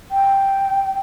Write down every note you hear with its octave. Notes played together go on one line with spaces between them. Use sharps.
G5